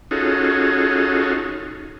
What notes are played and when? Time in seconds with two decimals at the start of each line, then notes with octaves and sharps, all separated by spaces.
0.11 C#4 D#4 F4 F#4 G#4 A4